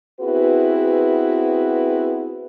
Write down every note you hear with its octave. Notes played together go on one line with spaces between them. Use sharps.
B3 C4 E4 F#4 G#4 B4